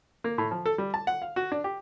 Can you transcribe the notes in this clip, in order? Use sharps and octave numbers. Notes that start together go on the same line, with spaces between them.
A#3
A2
F3
A4
G3
A5
F#5
F5
F#4
D4
G4